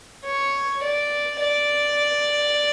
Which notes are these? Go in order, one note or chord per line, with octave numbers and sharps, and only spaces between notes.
C#5
D5
D5